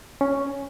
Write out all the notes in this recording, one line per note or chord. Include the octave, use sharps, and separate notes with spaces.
C#4